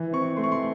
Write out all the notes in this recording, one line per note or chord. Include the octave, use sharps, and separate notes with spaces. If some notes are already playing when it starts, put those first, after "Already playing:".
Already playing: E3
C4 C#6
A3 C6
C#6
C6